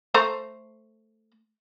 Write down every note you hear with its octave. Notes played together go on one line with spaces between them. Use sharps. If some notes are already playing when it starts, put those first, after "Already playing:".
A3 C5 A#5